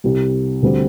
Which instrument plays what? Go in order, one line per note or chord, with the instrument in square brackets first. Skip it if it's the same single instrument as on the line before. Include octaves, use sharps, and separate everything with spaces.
[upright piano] C2 C3 G3
D2 D3 G3 C4